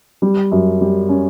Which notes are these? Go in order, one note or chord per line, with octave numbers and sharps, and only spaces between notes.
G3
F#2
G3
C#4